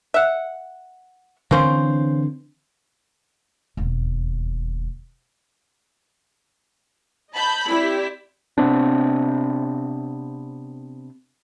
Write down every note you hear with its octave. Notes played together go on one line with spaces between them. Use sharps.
E5 F#5
D3 E3 A#3 C4 C#4 C5
E1 D#2
D#5 A5 B5 G6
C4 E4 G4 D5 B6
C3 B3 C4 D4